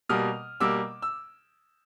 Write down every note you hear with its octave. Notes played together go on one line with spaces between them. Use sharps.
B2 G3 A#3 D#6 F6
B2 G3 A#3 D6 E6
E6